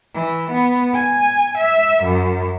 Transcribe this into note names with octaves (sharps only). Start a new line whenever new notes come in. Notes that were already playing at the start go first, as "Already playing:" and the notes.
E3
B3
G#5
E5
F#2